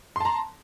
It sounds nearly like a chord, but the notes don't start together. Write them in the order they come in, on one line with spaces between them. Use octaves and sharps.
C6 A5 A#5